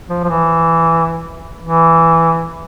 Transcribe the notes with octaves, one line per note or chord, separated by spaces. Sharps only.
F3
F3
E3
E3